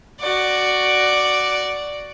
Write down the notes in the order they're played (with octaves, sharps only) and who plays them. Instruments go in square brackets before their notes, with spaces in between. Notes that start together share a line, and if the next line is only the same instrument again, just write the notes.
[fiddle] F#4 D5